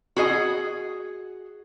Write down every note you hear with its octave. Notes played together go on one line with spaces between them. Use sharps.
F#4 G#4 D#5